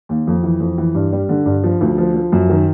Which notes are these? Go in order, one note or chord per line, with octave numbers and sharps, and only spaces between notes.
D#2
F2
E3
F2
E3
G2
G3
D3
G2
F3
D2
F3
F3
F#2
D#3